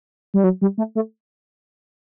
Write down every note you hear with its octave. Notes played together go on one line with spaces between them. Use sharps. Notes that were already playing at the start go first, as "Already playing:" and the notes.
G3
F#3
G3
A3
A3